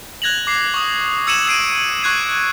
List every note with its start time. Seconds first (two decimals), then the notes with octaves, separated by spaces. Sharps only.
0.22 F#6 G#6 A#6 F7 F#7
0.47 D6 C7
0.74 C#6 D#6
1.27 E6 G#6 C#7 D#7 E7 F#7
1.46 E6 G#6 C7 D7 D#7
2.02 C#6 F#6 G#6 C7 F#7